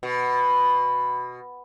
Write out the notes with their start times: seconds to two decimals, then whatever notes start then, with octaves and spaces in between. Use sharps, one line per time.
0.03 B2